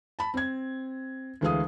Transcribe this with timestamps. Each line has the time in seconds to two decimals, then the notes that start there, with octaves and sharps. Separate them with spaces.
0.19 A5 B5
0.34 C4 G#6
1.41 D2 E3 G#3 F5 D#6